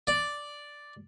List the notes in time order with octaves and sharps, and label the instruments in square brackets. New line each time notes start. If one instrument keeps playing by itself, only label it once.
[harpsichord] D5